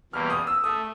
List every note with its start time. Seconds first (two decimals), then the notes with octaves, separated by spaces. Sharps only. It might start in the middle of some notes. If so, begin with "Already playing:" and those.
0.13 E2 B2 G3 A#3 F6
0.30 D#6
0.47 E6
0.63 A3 D#6